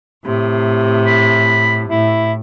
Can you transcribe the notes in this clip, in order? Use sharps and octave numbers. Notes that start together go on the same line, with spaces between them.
A2 C3
B5
A2 E4